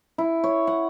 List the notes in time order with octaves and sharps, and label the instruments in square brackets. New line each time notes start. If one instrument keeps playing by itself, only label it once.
[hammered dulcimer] E4
C#5
F#5